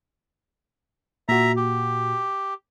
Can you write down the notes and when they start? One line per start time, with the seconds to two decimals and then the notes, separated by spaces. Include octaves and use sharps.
1.28 A#2 F#4 E5 A#5
1.56 G4